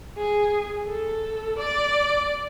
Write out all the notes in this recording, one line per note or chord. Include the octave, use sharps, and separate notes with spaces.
G#4
A4
D5